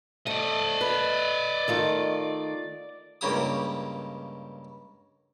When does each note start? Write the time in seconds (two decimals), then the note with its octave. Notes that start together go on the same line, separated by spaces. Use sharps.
0.27 A3 D5 D#5
0.81 B4
1.68 D#3 A3 F4
3.21 C#2 G2 C#3 A#3 G4 D#6